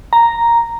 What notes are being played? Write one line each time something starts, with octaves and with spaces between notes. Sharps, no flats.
A#5